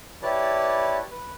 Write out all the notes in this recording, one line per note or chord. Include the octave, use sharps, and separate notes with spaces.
E4 G4 B4 C#5 D5 A5
B4